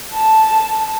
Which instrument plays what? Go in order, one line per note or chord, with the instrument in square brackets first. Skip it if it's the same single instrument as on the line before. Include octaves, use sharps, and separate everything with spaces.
[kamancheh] A5